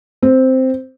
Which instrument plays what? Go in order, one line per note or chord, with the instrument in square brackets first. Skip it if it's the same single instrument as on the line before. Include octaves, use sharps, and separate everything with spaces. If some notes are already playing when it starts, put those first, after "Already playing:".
[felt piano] C4